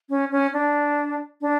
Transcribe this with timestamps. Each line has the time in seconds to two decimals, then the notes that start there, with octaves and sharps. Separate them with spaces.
0.09 C#4
0.31 C#4
0.54 D4
1.41 D4